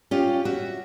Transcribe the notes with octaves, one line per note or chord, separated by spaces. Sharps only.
C#4 F4 G4
F#4 E5